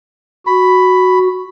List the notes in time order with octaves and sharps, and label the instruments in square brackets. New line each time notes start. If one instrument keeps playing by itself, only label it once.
[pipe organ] F#4 [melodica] B5